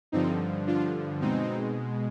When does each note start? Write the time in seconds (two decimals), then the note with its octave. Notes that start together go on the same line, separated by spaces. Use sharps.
0.12 G2 D3 F3 C4 D#4
0.67 D4 F4
1.21 B2 G#3 C4 D#4